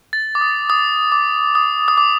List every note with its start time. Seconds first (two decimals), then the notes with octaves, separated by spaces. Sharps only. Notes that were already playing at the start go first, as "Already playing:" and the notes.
0.13 A6
0.35 D6
0.41 D#6
0.70 D#6
1.12 D6
1.55 D#6
1.88 D#6
1.97 D6